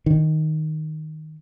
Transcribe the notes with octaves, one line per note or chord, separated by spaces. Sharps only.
D#3